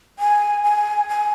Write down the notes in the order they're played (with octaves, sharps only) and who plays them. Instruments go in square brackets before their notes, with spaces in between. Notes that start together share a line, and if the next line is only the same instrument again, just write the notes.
[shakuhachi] G#5
G#5
G#5